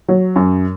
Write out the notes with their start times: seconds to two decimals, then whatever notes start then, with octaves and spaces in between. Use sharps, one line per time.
0.08 F#3
0.36 F#2